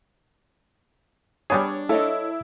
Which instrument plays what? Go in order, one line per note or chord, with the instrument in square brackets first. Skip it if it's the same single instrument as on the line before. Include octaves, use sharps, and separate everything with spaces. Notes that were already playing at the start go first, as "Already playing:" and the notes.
[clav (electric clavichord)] G3 B3 G#4 [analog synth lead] D4 [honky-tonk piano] C#5
[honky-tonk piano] E4 [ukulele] A4 C#5 D#5